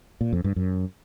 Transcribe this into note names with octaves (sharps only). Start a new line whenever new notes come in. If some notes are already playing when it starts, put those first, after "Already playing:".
A#2
F2
G2
F#2